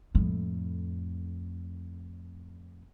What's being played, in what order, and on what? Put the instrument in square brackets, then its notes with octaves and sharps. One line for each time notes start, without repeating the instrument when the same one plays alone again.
[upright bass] F2 A2